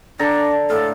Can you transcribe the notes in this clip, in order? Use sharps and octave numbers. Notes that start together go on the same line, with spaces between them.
D3 D4 A4 A#5
A2 A4 F5